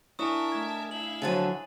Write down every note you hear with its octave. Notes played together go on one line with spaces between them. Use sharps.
D4 E4 A#4 E5 G#5 A5 C#6 D#6
A3 G#6
E4 E5 F5 F#7
D3 F3 F#3 G#5 A6 D#7